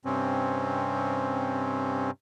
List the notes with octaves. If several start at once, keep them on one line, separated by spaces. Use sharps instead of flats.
G2 C3 C4 C#4